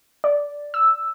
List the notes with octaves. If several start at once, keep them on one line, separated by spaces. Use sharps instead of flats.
D5
E6